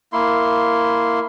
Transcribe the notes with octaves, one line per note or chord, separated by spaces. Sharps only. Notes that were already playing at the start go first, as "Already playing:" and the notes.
A#3 E4 C6